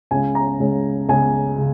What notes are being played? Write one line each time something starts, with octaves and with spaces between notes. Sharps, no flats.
C#2 C#3 G#3 C#4 G#5
A#5
C#2 C#3 G#3 C#4
C#2 C#3 G#3 C#4 G#5
C#3